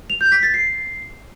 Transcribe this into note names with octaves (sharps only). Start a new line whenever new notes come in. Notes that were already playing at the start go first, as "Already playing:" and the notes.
F7
G6
B6
A6
C7